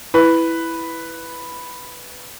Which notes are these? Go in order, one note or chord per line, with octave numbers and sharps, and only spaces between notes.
E4 B4